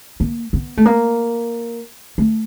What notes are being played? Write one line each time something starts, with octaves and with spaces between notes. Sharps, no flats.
A#3
B3
A3
A#3
A3